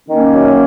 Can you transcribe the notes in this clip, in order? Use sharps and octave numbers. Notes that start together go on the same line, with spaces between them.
D#3 A#3 C#4
F#2